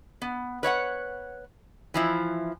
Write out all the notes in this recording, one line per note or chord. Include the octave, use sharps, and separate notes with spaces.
B3
B4 C#5 E5 F#5
E3 F3 E4